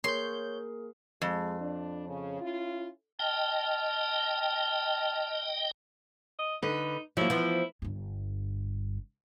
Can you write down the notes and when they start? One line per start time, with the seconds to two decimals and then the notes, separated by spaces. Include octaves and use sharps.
0.04 A#3 G#4 A#4 C#5 C6 G6
1.21 F2 G#3
1.59 D4
2.07 C#3
2.40 C#4 E4 F4
3.19 D#5 G5 A5 F6
6.39 D#5
6.63 D3 D#4 B4
7.17 F3 F#3 A#3 E4
7.30 E3 F3 B3
7.82 G1 G2